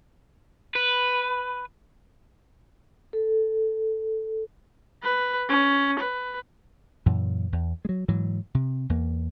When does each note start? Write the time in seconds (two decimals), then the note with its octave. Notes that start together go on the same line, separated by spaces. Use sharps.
0.75 B4
3.13 A4
5.03 B4
5.49 C#4
6.00 B4
7.06 F#2 A#2 E3
7.52 E2
7.85 F#3 G#3
8.08 G#2 E3 F#3
8.55 C3
8.89 E2 A#3